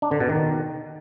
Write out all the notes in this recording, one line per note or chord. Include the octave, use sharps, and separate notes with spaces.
D4
D3
B2
D#3